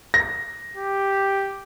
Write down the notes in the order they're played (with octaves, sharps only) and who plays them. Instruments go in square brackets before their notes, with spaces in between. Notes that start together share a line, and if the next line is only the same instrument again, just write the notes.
[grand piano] A#6
[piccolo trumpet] G4